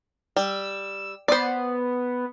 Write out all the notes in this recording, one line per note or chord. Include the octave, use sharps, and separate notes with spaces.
G3 E6
B3 C5 D5